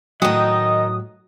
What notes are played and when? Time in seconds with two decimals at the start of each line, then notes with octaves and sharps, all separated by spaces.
0.22 A2 D#3 F#3 D#4 D#5 D#6